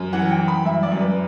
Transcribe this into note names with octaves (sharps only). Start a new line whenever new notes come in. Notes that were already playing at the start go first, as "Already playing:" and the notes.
Already playing: F#2
E3 F#5
G5
E3
B5
F#2 E5
D5
F#2
B4